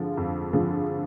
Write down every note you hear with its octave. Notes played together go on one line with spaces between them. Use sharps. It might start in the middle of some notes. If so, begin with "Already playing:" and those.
Already playing: F2 D3 F3 G#3
F2
D3 F3 G#3